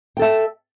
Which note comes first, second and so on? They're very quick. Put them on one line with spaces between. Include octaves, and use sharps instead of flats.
G5 A4 E5